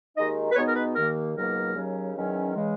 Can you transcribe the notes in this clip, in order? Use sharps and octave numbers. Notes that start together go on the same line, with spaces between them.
D#2 D#3 G#3 D#4 D#5
B4
B2 G#3 B3 D#4 C#5
A#4
B4
D#2 D#3 A#3 A#4
C#2 B2 F#3 A#3 D#4 A#4
D#2 C#3 F#3 C#4
E2 D#3 F#3 C#4
C#3 E3 G#3